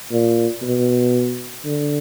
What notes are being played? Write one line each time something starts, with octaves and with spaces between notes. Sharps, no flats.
A#2
B2
D3